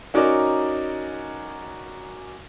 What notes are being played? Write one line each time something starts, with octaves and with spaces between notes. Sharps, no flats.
C#4 D#4 F#4 A#4 D5